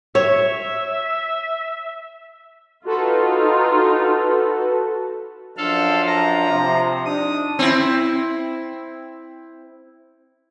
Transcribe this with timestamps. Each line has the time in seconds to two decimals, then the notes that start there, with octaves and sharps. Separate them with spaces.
0.15 C#5 E5
2.85 D#4 F4 F#4 A4 B4
5.57 F#2 F3 D4 A4 F5
6.07 A#5
6.49 C3 F3
7.05 D4 D#4 D#6
7.59 C4 E4